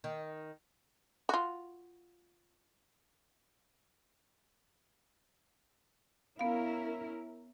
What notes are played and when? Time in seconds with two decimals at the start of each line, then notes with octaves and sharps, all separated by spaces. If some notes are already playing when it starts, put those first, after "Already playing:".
0.04 D#3
1.29 F4 F#4
6.39 B3 C#4 E4 A#4 F5